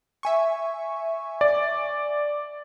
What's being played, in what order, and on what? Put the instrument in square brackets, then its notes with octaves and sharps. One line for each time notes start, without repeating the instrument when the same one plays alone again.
[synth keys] E5 G#5 C#6
[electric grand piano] D5